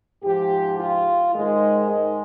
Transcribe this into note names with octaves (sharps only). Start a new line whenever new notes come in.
G#2 F3 G4
F4
G#2 D#3 G#3
G#3